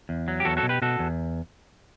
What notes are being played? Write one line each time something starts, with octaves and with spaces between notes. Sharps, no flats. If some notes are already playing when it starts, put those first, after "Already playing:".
E2
F#3
G4
E2 F#4 A4
F#4 A4
B2
G4 B4
B2 F#4 A4
E2